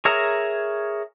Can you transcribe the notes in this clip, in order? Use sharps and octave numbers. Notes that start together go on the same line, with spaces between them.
G#4 A#4 C#5 E5 A#5